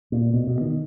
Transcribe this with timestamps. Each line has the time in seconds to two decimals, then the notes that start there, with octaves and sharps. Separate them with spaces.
0.12 A#2
0.34 B2
0.47 B2
0.61 D#3